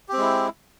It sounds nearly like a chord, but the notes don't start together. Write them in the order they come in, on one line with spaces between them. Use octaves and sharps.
G4 C4 G#3 E4